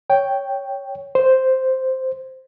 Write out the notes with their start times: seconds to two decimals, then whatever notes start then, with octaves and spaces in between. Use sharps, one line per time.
0.10 C#5 G5
1.15 C5